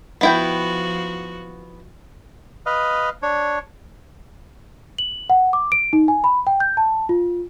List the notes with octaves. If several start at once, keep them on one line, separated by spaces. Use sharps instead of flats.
F3 B3 E4 F#4 G5
B4 D#5 F5
D4 C#5
F#7
F#5
D6
D7
D#4
G#5
B5
G5
G6
A5
F4